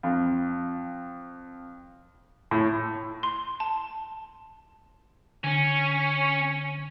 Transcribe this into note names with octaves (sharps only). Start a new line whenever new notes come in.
F2
A2
C6
A5
D3 C#4